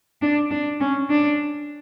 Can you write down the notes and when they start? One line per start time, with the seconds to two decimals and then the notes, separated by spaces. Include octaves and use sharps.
0.22 D4
0.51 D4
0.80 C#4
1.10 D4